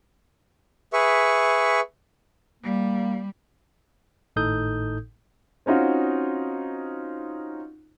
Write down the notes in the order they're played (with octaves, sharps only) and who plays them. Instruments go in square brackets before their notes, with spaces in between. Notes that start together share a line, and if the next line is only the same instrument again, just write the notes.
[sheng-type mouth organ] G#4 B4 E5 C#6
[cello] G3 [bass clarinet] A#3
[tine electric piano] G#1 A2 D#4 A4 D#6 G6
[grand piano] C4 C#4 D#4 F4 F#4